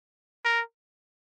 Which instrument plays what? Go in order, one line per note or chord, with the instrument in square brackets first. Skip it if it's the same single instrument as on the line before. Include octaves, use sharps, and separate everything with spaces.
[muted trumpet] A#4